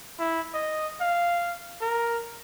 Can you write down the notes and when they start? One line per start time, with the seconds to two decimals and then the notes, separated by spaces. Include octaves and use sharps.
0.19 E4
0.54 D#5
1.01 F5
1.81 A#4